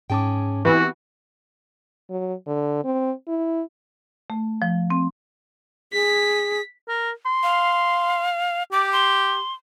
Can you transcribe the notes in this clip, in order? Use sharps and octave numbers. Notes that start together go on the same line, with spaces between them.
G#2 C#4 G#4 G5 A5 D6
E3 B3 C4 F#4 G4
F#3
D3
C4
E4
A3
F3
C4
G#4 B6
A#4
C6
F5
G4 D6
C6